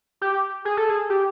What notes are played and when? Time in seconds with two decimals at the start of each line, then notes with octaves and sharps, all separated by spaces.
0.21 G4
0.65 G#4
0.77 A4
0.89 G#4
1.10 G4